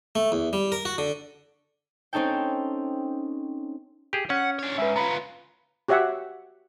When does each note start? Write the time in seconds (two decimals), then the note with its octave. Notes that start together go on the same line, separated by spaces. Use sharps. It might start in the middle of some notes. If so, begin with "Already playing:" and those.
0.15 A3
0.32 E2
0.53 G3
0.72 A#4
0.85 F#4
0.98 D3
2.13 C4 C#4 D#4 A4 G5
4.13 G4 G#4
4.30 C#4 F#5
4.59 D4 C#5
4.78 G#2 B4 E5
4.96 B3 F4 A#5 B5
5.88 F#4 G4 C#5 E5 F#5